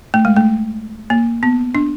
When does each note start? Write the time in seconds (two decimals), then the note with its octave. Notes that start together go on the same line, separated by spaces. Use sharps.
0.14 A3
0.25 G#3
0.36 A3
1.10 A#3
1.43 B3
1.75 D4